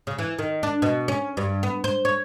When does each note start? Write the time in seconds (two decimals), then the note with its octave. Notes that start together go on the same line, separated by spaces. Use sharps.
0.07 C#3
0.19 E3
0.39 D#3
0.63 D4
0.82 B2
1.08 C#4
1.37 G2
1.63 B3
1.84 C5
2.05 C#5